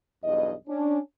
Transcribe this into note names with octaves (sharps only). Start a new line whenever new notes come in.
B1 E2 G2 D#5
C#4 D4